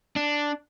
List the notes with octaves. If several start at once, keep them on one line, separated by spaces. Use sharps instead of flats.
D4